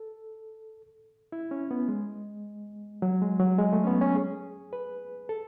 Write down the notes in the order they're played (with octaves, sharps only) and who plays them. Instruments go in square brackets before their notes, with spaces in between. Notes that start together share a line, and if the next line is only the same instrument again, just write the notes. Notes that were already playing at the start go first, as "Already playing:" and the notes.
Already playing: [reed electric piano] A4
E4
C#4
B3
G#3
F#3
G#3
F#3
G#3
A3
C#4
B3
C#4
G#4
B4
A4